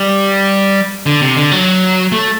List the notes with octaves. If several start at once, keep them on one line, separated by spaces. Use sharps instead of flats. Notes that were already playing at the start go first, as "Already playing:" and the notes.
Already playing: G3
D3
C3
D3
F#3
A3